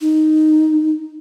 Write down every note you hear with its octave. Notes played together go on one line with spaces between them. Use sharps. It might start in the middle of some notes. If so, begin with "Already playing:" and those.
D#4